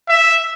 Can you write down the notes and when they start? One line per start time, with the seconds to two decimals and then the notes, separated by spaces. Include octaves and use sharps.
0.09 E5